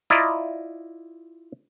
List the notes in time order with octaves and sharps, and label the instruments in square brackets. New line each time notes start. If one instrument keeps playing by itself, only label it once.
[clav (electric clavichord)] E4 F4 D5 D#5 A#5